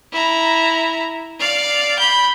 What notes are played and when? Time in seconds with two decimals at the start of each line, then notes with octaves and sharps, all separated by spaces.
0.12 E4 A#5
1.39 D5 F5
1.99 B5 G6